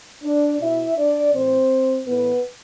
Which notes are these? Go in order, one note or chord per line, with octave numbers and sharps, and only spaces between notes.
D4 D5
B2 E4 E5
D4 D5
A2 E3 C4 C5
A2 E3 B3 B4